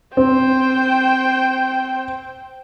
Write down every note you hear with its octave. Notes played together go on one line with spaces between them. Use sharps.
C4 C5 G5